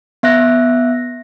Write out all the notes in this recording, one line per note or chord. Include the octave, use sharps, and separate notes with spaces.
B3 E5 F#6 A#6